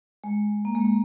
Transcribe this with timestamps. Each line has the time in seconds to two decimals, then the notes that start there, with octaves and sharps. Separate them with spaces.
0.24 G#3
0.65 A#3
0.75 G#3
0.85 A#3